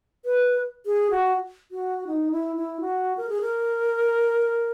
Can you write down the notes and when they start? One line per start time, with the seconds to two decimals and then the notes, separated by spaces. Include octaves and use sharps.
0.25 B4
0.86 G#4
1.11 F#4
1.71 F#4
2.07 D#4
2.32 E4
2.56 E4
2.81 F#4
3.17 A#4
3.29 G#4
3.41 A#4